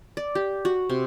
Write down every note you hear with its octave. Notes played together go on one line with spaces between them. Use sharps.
D5
G4
F#4
C3